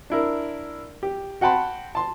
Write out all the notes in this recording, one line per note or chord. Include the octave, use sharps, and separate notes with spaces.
D4 E4 A#4
G4
F#4 F#5 G5 A5 B5 C6
A5 C6